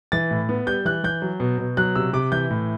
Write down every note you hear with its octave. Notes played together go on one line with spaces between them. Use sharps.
E3 A6
A2
B3
G3 G6
E3 F#6
E3 G6
F#3
B2
B2
F#3 F#6
C3 E6
C3 D6
E3 G6
A2